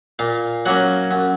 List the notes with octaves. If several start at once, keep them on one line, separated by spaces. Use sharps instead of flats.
A#2 F5
F#3 A#3 C#4 F#5
F#2